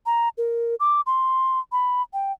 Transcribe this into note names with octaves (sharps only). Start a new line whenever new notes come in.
A#5
A#4
D6
C6
B5
G5